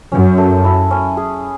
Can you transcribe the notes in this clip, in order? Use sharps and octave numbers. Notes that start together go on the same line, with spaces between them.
F#2 C#4
A3
E4
C#4
G#4